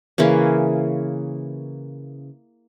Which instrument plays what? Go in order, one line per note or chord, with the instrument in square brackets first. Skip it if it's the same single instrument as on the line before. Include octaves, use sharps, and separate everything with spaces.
[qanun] C#3 E3 A#3 C#4